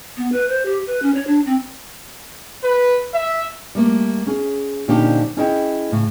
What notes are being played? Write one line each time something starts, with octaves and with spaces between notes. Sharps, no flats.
B3
B4
C5
G4
B4
C#4
C#5
D4
C4
B4
E5
G3 A3 A#3
C#4 G#4
A#2 D3 F3 C#4 D#4 G4
C#4 E4 G#4 D#5 E5 G5
A2 C#3